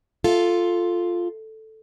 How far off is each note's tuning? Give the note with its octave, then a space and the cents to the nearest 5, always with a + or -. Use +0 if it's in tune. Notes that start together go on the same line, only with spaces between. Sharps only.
F4 +0 A4 +0